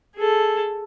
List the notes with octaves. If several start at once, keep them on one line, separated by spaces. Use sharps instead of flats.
G#4 A4